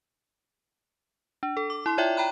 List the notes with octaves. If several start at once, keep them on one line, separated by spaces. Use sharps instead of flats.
D4
A4
D6
E4 C6
F4 C#5 D5 E5 G5
G5 A#5 B5 F#6